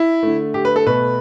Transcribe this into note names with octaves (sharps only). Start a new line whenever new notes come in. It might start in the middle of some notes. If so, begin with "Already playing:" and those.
Already playing: E4
D3 A3
G4
B4
A4
B2 A3 B4